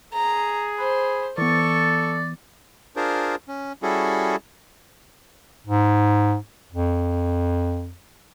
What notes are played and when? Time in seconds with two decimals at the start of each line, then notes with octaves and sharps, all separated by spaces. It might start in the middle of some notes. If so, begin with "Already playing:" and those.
0.13 G#4 A#5
0.78 C5 B5
1.38 E3 B3 A4 D5 C#6
2.96 D4 F4 G#4 A#4 C5
3.48 C#4
3.83 G3 C#4 E4 F#4 G#4 A4
5.67 G#2
6.72 F2